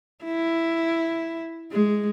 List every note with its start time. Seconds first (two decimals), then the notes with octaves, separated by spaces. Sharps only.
0.24 E4
1.72 G#3